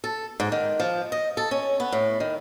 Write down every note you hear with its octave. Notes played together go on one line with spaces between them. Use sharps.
A4
G#2
D#3
F3
D#5
A4
C#4
B3
A2
D#3